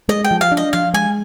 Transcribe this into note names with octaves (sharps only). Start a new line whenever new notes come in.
G#3 D#5
G5
F3
F5
D4
D#5
F3 F5
G#3 G#5